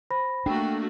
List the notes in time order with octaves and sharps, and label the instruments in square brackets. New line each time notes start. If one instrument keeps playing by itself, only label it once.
[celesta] C5 B5 A#6
[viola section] A3 A#3 F#4 [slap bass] D4 [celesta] G5